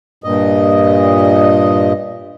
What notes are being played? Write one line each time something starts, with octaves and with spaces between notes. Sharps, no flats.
G2 A#2 D#5